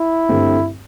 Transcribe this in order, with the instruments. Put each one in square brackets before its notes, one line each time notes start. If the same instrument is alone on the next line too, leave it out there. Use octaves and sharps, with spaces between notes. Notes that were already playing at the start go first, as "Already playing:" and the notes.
Already playing: [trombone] E4
[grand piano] G2 D3 A3 C4 G4